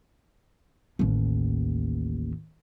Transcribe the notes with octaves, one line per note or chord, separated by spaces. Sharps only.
A1 D#2